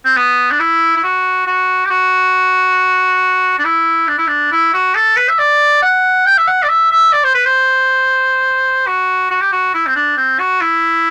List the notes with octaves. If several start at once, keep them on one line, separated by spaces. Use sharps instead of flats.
C4
B3
D4
E4
E4
F#4
F#4
G4
F#4
D4
E4
D4
E4
D4
E4
F#4
A4
B4
E5
D5
F#5
G5
E5
F#5
D5
E5
E5
D5
C5
B4
C5
F#4
F#4
G4
F#4
E4
C4
D4
C4
F#4
E4